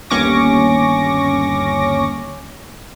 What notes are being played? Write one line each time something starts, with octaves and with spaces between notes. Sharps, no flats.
G1 D#2 C#4 C#6 D6 A#6